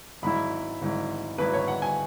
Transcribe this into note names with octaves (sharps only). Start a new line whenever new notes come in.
G#1 G#2 F#3 E4 B5
G#1 G#2 F#3 E4
G#1 G#2 F#3 E4 B4
C#5
F#5
G#5